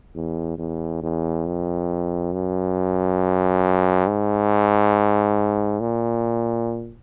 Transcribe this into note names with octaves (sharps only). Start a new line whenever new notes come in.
E2
E2
E2
F2
F#2
G#2
A#2